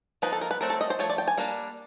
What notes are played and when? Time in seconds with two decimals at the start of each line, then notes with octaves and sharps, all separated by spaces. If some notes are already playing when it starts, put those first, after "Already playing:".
0.22 F3 A#3 D#4 B4
0.32 A4
0.41 A#4
0.51 B4
0.61 F#3 A3 C4 A#4
0.70 A4
0.81 D#5
0.90 C5
0.99 F3 A3 C#5
1.10 D5
1.18 G5
1.28 G#5
1.37 G3 A#3 D4